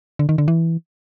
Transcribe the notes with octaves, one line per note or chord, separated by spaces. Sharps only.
D3
D#3
D3
E3